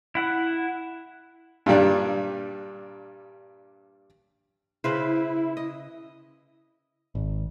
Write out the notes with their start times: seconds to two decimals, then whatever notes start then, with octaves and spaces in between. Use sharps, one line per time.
0.15 E4 F#5
1.66 G2 A#2 G3 D4
4.84 C#3 E4 B4 C5
5.57 D#5
7.15 G#1